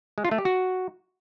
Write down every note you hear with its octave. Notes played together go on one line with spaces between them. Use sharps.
G#3
F4
A3
G4
F#4